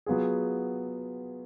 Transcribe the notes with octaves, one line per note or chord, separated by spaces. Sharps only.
F#3 B3 F4 G#4